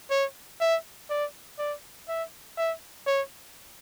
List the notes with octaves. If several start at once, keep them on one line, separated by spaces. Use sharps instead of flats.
C#5
E5
D5
D5
E5
E5
C#5